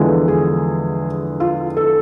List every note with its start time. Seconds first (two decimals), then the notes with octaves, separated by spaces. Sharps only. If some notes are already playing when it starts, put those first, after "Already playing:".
Already playing: E2 D3 F3 G#3
0.28 G#4
1.40 F4
1.77 A4